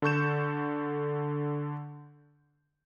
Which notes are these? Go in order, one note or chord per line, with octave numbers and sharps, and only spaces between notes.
D3 A4 C#6 G6 E7